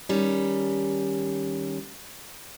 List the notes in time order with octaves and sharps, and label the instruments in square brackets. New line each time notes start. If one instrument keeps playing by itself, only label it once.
[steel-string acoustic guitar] D#3 G3 C#4